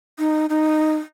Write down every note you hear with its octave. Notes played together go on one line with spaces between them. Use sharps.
D#4
D#4